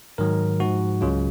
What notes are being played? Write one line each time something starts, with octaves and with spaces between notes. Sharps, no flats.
G#2 D#3 F#3 A#4
G#2 F3 F#4
C#2 C#3 F#3 F4